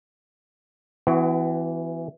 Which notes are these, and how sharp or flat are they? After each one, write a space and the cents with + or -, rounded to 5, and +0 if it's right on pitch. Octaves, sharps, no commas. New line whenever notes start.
E3 +10 B3 +45 F#4 +10